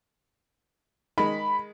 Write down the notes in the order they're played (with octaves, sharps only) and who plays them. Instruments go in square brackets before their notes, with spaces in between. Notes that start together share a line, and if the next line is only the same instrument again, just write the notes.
[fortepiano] D#3 G#3 [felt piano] B5